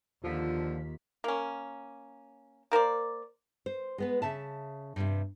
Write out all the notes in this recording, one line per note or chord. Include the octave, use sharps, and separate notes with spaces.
D#2 D3 F3 F4 B6
A#3 C#4
A#3 A#4 C5 D5
C5
G#3 B3 B4
C#3 E5 A5
G2 C3